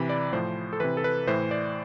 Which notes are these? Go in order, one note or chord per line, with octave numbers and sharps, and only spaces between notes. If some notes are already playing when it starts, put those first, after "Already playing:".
Already playing: C3 E3 B5
D5
A2 F3 C5
A4
C3 E3 B4
A4
B4
A2 E3 C5
D5